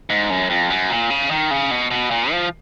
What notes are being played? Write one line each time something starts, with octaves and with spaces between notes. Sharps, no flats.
G#2
F#2
F2
F#2
A#2
C#3
D#3
C#3
B2
B2
A#2
F3